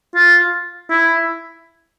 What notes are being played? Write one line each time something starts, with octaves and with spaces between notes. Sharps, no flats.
F4
E4